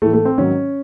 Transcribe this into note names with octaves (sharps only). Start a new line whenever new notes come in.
A2 E3 A3
A3
C4
G#2 D#3 F#3 C#4